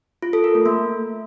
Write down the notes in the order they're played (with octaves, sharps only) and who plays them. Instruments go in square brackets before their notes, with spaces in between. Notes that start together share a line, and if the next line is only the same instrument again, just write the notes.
[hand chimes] F4
A4
A#4
A3
A#3